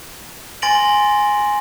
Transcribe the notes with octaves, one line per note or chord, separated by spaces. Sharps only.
G#5 C6 A6 A#6 D7 F#7